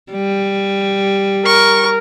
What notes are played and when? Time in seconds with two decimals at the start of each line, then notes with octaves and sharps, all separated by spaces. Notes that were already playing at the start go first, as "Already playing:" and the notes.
0.12 G3
1.46 A#4 C#6